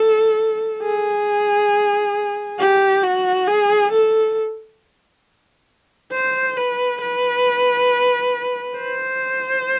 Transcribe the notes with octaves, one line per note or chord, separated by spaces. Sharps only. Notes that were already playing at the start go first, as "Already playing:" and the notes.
Already playing: A4
G#4
G4
F#4
G#4
A4
C5
B4
B4
C5